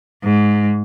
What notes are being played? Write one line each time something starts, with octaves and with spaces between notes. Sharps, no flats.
G#2